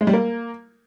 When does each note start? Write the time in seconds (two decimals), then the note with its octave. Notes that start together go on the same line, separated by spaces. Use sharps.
0.01 G#3
0.07 G3
0.13 A#3